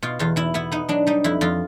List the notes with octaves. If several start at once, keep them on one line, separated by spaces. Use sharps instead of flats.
B2 F4
E2 F4
E2 E4
B3 E4
B3 D#4
F#3 D4
G3 D#4
F2 E4
F2 F4